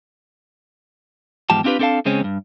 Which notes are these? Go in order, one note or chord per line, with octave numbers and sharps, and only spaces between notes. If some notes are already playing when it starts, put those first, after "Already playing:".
E2 G#2 F3 G4 A5
C4 D4 F4 G4 B4
C4 D4 A4 B4 F5 A5
C#3 G#3 C4 C#4
E2 G2